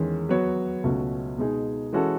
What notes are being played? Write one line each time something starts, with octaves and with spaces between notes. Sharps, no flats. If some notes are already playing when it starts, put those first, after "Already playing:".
Already playing: E2 D#3 G#3 C#4 G#4
F#3 B3 F#4 C#5
C#2 B2 A3 C#4 F#4
B2 G#3 D#4 G#4
E3 G#3 C#4 F#4 A4